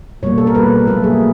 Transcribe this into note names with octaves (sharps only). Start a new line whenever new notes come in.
B2 G3 A#3 C#5
A4
A#4
B2 G3 A#3 B4
A#2 F#3 A3 A4
G#4